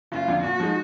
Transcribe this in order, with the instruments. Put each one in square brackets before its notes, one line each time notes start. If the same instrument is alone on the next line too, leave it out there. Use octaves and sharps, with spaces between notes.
[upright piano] F#1 [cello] F4
[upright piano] F2 D3
[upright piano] A#2 [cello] F#4
[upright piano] F3 G#3 D#4